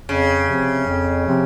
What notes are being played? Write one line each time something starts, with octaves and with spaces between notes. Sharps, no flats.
F2 C#3
C3 F3 C4
F2
C3 F3 C4